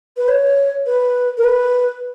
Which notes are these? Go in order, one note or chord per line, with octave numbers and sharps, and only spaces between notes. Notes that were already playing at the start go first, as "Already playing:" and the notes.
B4
C#5
B4
A#4
B4